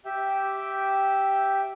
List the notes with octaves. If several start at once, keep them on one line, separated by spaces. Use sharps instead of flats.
G4 E5 G5